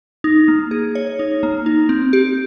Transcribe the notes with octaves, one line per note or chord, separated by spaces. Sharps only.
D#4
A#3
G#4
C#5
D#4
A#3
D#4
C4
G4